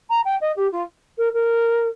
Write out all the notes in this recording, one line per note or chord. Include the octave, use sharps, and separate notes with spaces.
A#5
G5
D#5
G4
F4
A#4
A#4